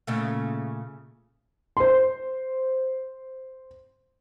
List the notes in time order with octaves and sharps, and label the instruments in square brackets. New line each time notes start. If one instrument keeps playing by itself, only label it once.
[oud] A#2 C#3 A3
[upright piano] C5 C6